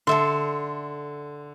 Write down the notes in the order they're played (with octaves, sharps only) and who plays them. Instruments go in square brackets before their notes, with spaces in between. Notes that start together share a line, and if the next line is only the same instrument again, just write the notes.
[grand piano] D3 [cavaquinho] A4 E5 C6